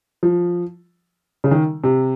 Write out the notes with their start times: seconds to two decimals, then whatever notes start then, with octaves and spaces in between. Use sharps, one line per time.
0.23 F3
1.44 C#3
1.51 D#3
1.84 C3